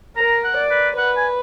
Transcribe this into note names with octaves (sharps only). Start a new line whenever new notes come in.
A#4 A#5
F#5
D5
B4
B4 F#5
G#5